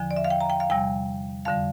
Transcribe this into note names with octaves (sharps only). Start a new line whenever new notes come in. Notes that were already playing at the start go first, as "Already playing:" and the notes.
Already playing: E2 D3 F3
D5
E5
F5
G5
A#5
G5
F5
E2 C3 G3 G5
F2 D3 G3 F5